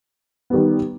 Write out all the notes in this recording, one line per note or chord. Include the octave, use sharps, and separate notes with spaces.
D#3 G3 B3